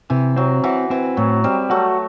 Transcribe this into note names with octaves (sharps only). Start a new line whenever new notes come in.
C3 E3
F#3 C4
E3 F#4
E3 C4
A2 F#3
G3 C4
F#3 A3 F#4